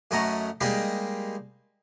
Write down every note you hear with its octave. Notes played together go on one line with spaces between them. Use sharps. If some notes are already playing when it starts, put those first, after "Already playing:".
F#2 A3 C#4 D#5 F#5 A#5
G3 G#3 A#3 D#4 G4